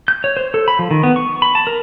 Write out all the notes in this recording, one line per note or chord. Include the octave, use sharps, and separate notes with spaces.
G6
C#5
C5
A4
B5
F3
D#3
B3
C#6
B5
A5
A#4